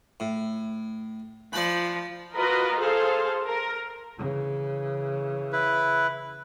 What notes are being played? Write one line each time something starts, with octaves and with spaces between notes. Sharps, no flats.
A2
F3 D5 A5 B5
F4 F#4 A#4 B4 D#5
G#4 A4 C5 F5
A#4
C#3 E3
E4 B4